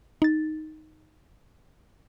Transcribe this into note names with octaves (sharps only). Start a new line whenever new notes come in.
D#4 A6